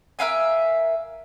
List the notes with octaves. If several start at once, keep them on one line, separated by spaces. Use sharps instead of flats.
A#4 E5 F5 G#5